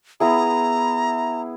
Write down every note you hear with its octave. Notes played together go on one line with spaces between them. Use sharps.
B3 E4 G#4 A#5